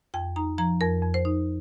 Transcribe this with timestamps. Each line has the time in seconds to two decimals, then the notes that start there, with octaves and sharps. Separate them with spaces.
0.14 F2 G5
0.36 D#4 A#5
0.58 F3 A#5
0.81 F2 A#4
1.03 F2
1.14 C5
1.25 D#4